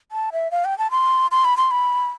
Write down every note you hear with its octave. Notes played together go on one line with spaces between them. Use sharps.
A5
E5
F5
G5
A5
C6
C6
B5
C6
B5